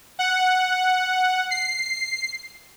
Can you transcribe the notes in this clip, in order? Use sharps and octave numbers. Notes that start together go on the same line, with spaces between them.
F#5
C7